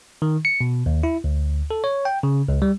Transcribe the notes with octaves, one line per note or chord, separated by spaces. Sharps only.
D#3
C#7
B2
D#2
E4
D2
A4
C#5
G5
C#3
C#2
G3